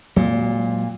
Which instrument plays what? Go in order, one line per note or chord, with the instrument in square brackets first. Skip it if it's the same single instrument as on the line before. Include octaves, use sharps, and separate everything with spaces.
[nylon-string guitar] A#2 [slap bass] F#3 G#3 C4